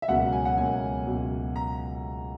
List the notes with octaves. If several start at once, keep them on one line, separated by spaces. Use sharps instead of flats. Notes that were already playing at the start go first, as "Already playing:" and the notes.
E5
C#2 B2 F#3 A#3 F#5
G#5
F#5
C#2 B2 F#3 A#3 G#5
C#2 B2 F#3 A#3
A#5